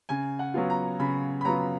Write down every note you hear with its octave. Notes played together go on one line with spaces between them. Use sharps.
C#3 G#5
F#5
F#3 B3 F4
A#5
C#3 B5
B5
F#3 B3 F4 A#5